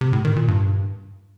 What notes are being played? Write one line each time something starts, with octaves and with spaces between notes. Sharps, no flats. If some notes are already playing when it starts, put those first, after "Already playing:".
C3
A2
D#3
A#2
G2